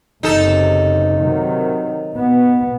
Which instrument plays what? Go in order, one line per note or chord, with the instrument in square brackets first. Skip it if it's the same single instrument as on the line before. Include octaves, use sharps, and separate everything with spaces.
[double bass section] F#1 C3 [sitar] D#4 A4
[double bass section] C3 D#3 F#3
B2 B3